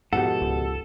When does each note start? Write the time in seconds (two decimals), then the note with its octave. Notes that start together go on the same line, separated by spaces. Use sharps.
0.13 G#2 B2 F3 G4 A4 F#5
0.42 C#2